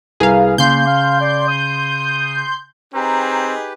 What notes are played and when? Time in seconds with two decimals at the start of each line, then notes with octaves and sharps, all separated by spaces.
0.20 C2 G#4 B4 F5 A#5
0.58 C#3 A#3 C6 G6
0.87 F5
1.21 D5
1.48 D#6
2.94 C4 D#4 G4 G#4 B4 A#5